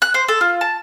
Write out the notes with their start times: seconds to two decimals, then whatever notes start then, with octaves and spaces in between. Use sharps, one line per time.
0.02 F#6
0.14 C5
0.28 A4
0.41 F4
0.61 A5